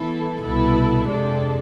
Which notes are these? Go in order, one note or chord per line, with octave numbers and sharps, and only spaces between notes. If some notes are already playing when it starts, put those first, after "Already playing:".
Already playing: E3 B3 E4 A4
C2 B2 B3 E4 A4
F2 C3 G#3 D4 A4